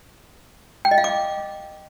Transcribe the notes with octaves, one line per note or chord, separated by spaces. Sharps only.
G5
D#5
F5
D6